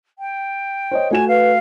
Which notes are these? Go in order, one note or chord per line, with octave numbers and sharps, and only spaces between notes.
G5
C5 C#5 D#5
A3 F#4 G#5 E7
B4 F5